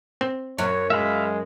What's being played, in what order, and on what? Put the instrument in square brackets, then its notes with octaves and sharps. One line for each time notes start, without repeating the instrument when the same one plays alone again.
[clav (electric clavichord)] C4
[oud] F#2 [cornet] C#5
[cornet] G#3 [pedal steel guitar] E5 F5 B5